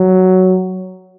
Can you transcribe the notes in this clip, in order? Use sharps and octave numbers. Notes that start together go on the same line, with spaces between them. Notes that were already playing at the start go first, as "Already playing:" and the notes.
Already playing: F#3